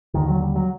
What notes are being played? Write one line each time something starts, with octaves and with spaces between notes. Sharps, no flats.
D#2 D3 D#3
F#3
G3
F#3